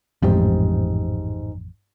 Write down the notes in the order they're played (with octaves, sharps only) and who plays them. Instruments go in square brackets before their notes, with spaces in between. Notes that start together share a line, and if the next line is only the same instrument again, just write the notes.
[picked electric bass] A1 F2 [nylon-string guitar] G#2 G4 C5